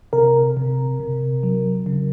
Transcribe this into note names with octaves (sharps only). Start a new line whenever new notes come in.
C3 A#4
C3
C3
F#3
C#3